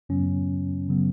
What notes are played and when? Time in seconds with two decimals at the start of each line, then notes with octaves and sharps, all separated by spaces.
0.09 F#2 C#3 F#3 B3 C#4
0.89 C#3 F#3 B3